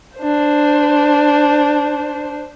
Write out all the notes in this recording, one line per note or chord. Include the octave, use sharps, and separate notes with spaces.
D4 C5